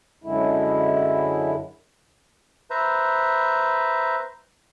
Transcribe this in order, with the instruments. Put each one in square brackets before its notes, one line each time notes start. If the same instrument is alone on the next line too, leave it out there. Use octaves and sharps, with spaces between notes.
[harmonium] F#2 D3 G#3 E4
[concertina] B4 C5 E5 A#5